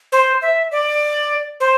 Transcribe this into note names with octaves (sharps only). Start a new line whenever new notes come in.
C5
E5
D5
C5